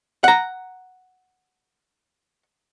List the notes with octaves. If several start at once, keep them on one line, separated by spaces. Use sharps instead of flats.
F#5 A#5